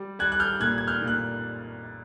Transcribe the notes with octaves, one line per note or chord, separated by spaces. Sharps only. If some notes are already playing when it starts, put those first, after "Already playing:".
Already playing: G3
G3 F#6 G#6
F#6
F6 G6
A#2 F#6 G#6
G#6
F6 G6
A#2
F#6